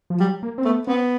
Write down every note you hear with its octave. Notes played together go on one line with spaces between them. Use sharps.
F3
F#3 G3
A#3
C4
A3 B3
B3 C4